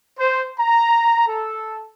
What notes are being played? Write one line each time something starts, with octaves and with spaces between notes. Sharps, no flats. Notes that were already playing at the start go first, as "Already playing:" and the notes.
C5
A#5
A4